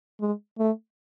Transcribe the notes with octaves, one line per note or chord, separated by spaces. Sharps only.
G#3
A3